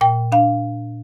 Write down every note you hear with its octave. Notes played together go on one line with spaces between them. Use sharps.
A#2 G5
D4 F5